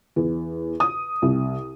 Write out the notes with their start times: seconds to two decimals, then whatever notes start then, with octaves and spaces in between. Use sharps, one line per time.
0.16 E2
0.80 D#6
1.22 C2